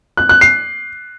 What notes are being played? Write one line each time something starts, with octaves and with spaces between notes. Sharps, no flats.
F#6
F#6
C7